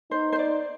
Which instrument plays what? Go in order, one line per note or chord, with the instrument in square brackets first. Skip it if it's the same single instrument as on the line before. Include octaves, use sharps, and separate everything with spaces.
[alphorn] D#4 [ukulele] C5
[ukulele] C5
D5